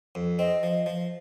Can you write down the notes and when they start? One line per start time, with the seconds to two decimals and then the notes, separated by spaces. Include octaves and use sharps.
0.15 F2
0.39 C4 D#5
0.63 F3
0.86 F3